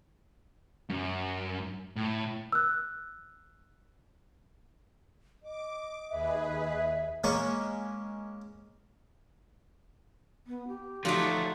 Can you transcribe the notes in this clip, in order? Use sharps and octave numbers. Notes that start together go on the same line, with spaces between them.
F#2
A2
E6 F#6
D#5 D6
D#2 G#4 B4 E5
G#3 A#3 C#4 B5 C#6
B3
G4
F3 F#3 A3 D#4 F4 F#4 D5